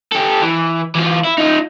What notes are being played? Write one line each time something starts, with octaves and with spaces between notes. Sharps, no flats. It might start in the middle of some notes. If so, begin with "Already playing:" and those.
G4 A4
E3
E3 F4
E4
D#4 F4